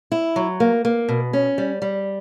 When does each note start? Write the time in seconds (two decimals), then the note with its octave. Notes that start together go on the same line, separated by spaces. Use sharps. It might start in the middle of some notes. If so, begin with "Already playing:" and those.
0.12 E4
0.36 F#3
0.60 A#3
0.85 A#3
1.09 B2
1.33 C#4
1.58 G3
1.82 G3